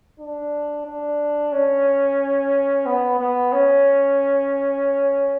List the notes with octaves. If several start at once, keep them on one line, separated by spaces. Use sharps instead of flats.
D4
D4
C#4
B3
B3
C#4